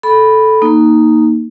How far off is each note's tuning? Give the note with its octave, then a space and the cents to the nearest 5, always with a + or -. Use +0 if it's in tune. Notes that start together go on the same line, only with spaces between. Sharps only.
A4 -10 B5 +0
A#3 +0 D#4 +0